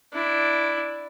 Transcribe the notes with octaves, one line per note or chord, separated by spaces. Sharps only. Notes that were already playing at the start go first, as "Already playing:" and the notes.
D4 E4